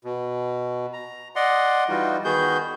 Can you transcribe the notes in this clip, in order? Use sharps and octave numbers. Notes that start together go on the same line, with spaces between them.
B2
A#5
D5 D#5 F#5 C6
E3 G3 D#4 F4 F#4
D#3 B3 F#4 G#4 G6